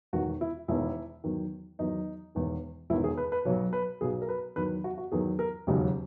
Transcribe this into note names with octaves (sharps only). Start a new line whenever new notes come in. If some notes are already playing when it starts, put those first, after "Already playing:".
E1 E2 D#3 F#4
E4
E1 E2 D#3 E4
E2 D#3 F#3
E2 D#3 F#3 D#4
E1 E2 D#3
E1 E2 D#3 E4
G#4
B4
B4
B1 B2 F#3 C#5
B4
B1 B2 F#3 G#4
A#4
B4
E2 D#3 F#3 B4
F#4
F#4
E2 D#3 F#3 G#4
A#4
E1 D#2 C#3 F#3 D#4